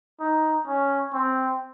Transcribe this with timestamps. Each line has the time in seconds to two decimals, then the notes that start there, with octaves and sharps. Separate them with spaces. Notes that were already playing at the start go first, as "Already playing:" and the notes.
0.20 D#4
0.67 C#4
1.13 C4